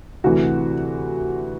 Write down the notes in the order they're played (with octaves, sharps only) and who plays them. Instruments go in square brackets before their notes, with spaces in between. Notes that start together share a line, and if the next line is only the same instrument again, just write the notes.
[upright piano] D2 C3 E3 F#4